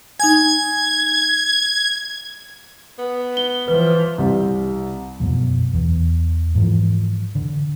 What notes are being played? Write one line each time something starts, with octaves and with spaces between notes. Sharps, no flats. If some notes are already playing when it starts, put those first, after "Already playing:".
D#4 G#5 G#6
B3
G7
E3 F3 B4
C2
F#2 B2 F3
E2
G#2 E3 F3
D3